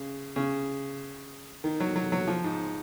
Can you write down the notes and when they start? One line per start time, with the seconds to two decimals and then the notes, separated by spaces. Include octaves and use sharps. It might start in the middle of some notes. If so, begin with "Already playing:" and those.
Already playing: C#3
0.36 C#3
1.64 D#3
1.80 F#3
1.96 F#3
2.12 F#3
2.28 F3
2.44 G#2